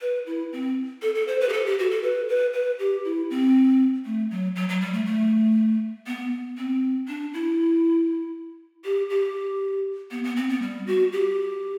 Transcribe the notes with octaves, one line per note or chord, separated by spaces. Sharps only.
B4
E4
C4
A4
A4
C5
B4
G4
A4
G4
F#4
A4
B4
B4
B4
G4
E4
C4
A3
F#3
F#3
F#3
G3
A3
A3
B3
C4
D4
E4
G4
G4
B3
B3
C4
B3
G3
F#4
G4